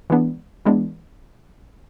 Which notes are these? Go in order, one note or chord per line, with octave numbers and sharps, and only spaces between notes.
E3 G#3 B3 D4
E3 G#3 B3 D4